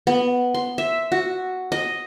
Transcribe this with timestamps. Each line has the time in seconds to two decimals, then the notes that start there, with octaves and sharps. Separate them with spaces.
0.07 B3
0.54 C6
0.78 E5
1.12 F#4
1.72 D#5